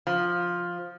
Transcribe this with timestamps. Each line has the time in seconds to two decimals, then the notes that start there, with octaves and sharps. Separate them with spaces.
0.07 F3